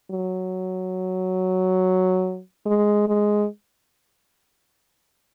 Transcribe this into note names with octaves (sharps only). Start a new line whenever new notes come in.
F#3
G#3
G#3